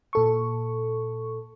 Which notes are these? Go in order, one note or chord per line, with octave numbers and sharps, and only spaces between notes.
A#2 A4 C#6